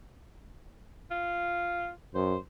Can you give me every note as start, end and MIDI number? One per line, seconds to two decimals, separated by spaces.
1.11 1.90 65
2.15 2.37 42
2.15 2.37 72